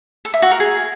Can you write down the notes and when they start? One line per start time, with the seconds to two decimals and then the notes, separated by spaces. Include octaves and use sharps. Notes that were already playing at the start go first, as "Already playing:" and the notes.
0.25 A4
0.34 E5
0.42 F#4
0.51 A#4
0.60 G#4